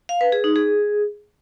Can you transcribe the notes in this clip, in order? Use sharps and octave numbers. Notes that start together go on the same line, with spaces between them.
F5
B4
G#4
D#4
G#4